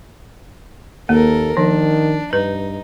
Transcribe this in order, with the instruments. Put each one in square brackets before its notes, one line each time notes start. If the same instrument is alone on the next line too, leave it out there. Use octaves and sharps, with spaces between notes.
[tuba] D#2 [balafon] A#3 [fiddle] A4 A#4
[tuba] D#3 [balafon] F3 [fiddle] D4
[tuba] G2 [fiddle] D#4 [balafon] B4